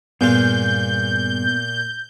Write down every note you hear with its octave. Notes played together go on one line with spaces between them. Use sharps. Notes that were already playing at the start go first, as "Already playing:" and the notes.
G2 A#2 B3 F4 G#4 G6